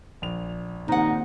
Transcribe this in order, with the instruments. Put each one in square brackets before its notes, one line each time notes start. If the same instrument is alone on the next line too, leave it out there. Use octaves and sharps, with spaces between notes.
[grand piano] A#1 F7
[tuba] D#2 [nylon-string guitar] C3 F#5 [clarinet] D#4